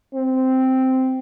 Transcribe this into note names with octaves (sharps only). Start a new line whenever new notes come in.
C4